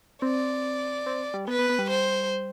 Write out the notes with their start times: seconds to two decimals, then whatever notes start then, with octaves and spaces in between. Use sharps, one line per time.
0.22 C4 D5
1.06 C4
1.34 G3
1.48 B3 B4
1.59 B3
1.69 B3
1.79 G3
1.90 C5